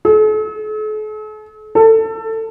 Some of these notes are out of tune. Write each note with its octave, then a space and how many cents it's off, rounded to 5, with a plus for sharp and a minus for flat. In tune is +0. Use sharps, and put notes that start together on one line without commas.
A4 -45
A4 +20